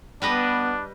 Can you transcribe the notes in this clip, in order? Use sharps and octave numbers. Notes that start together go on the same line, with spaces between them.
G3 B3 D4 B4 D#5